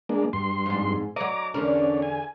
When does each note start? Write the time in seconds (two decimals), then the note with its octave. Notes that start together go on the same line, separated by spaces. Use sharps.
0.09 G#3 A#3 D4
0.33 G2 C6
0.66 F2 G#2
1.16 F#3 C#5 D#5 A#5 D6
1.54 E2 D3 C#4 D4 A#4
2.02 G#5